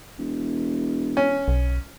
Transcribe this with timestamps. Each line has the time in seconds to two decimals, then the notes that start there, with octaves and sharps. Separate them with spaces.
0.19 E1
1.17 C#4
1.48 B1